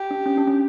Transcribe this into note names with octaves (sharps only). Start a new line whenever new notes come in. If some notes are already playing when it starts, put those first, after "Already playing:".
Already playing: G4
D4
C#4
D4
C#4